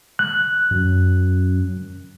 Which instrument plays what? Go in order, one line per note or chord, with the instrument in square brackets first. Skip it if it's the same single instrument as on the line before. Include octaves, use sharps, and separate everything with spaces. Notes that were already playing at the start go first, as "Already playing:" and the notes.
[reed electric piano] F#6
[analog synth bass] F#2